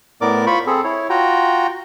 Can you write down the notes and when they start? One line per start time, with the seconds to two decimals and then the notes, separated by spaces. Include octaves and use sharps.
0.21 A2 B3 A#4 D5 D6
0.47 F4 C5 B5 C#6
0.67 C4 G#4 A4
0.84 E4 C#5
1.10 F4 F#4 G5 A#5